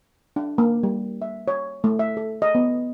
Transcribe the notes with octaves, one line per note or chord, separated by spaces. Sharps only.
D4
A#3
G3
E5
C#5
A3
E5
A4
D#5
B3